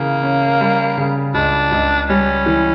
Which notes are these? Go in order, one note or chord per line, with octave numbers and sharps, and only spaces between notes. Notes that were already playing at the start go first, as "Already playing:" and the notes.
Already playing: C#3 E3 A#3
C#4
G3
C#3
C#2 D4
C#2
G3 C#4
E3